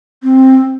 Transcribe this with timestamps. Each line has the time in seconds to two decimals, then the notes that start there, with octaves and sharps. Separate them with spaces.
0.23 C4